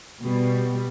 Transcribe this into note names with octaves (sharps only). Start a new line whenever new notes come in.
B2 G3